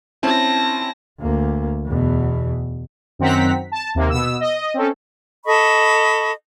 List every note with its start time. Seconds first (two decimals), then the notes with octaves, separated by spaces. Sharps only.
0.23 C4 C#4 E4 A5 A#6
1.20 D2 A#3
1.85 E2 B2
3.19 F#2 D#3 C4 F#5 A#5 B6
3.72 A5
3.95 D#2 C3 A#3
4.10 B2 B3 E6
4.40 D#5
4.74 C4 C#4 A4
5.45 A4 D#5 B5 C#6